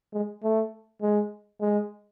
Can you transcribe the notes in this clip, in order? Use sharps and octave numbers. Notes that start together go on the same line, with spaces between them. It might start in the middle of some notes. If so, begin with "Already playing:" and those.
G#3
A3
G#3
G#3